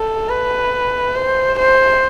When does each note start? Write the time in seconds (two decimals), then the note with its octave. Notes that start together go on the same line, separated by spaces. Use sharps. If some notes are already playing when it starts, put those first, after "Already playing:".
Already playing: A4
0.29 B4
1.15 C5
1.59 C5